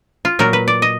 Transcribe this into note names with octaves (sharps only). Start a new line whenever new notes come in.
F4
A#2 F#3 A#4
B4
D5
D#5